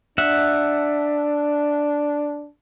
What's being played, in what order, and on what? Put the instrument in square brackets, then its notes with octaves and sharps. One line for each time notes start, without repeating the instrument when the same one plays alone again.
[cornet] D4 [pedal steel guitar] E5 F#5